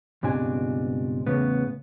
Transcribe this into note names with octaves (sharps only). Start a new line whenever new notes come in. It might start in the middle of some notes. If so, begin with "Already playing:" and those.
C#2 G2 B2 C4 D4 G#5
E2 A2 C#3 B3